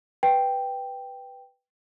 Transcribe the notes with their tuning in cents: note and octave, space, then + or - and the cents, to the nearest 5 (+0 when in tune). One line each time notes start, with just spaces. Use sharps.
B4 +0 G5 +0